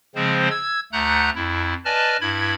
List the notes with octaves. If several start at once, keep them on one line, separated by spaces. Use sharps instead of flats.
C#3 F3 G#3 C4 C5
E6 G#6
D2 A3 F#5 A#5 F#6 G6
F2 E4
B4 D5 D#5 G#5 A5 F6
G2 E4 B5 G#6